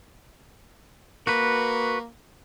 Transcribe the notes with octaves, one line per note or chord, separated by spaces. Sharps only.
A#3 F#4 B4